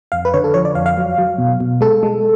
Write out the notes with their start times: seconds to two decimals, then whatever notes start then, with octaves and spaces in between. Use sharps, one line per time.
0.12 F2 F5
0.25 B4
0.34 D3 C#5
0.44 A4
0.54 F3 C#5
0.65 D5
0.75 F2 F5
0.86 F5
0.97 F#3
1.18 F#3
1.38 B2
1.60 B2
1.81 G#3 A4
2.03 G#3